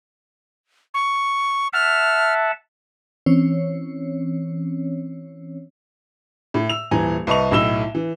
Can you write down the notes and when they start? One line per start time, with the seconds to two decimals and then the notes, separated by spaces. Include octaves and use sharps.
0.94 C#6
1.73 E5 F#5 A5 F6
3.26 E3 C4 C#4 C#5
6.54 A2
6.69 E6 F7
6.91 D#1 E3 G#5 A#5
7.27 C2 B4 D#5 A5 C#6 F7
7.51 B1 A2 D#5 E6 E7 G7
7.95 E3